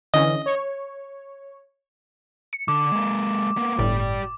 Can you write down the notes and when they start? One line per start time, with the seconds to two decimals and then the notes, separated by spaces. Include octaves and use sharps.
0.14 D3 E3 C#4 D#5
0.46 C#5
2.53 C#7
2.68 D3 D6
2.92 G#3 A#3
3.57 A#3 B3
3.79 G1 A2 G4 D5